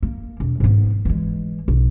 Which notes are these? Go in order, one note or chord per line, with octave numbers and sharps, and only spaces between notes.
A#3
E1
G#2 B3
E3 G#3
B1